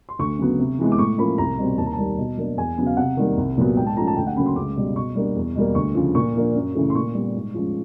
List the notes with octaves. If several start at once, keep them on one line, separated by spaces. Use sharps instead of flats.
C6
D2 C#6
C#3 F#3 B3
C3
E3 G#3 B3
D6
A2 C#6
F3 A#3 C#4 B5
C2 A#5
B2 G3 C4
D#2 A5
A#5
A5
D#3 G3 A#3
B2
F#3 A#3 D4
E2 G#5
C#3 F#3 B3
F5
C3 F#5
D#3 G3 A#3
C2
A#2 F#3 B3
G#2 G5
A5
F3 A3 C#4 A#5
A5
D2 G5
F#5
C#3 F#3 A#3 C#4 B5
C6
C#2 D6
B2 G3
B2 C#6
G3 A#3 D4
E2
B2 G3 A#3
D2 C#6
C#3 F3
A#2 C#6
F3 A#3 D4
F#2
C#3 E3 A3
C6
A#2 C#6
G3 B3
G#2
F3 G#3 C#4